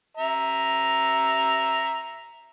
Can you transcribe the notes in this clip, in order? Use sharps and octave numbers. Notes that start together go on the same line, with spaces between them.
E5 A#5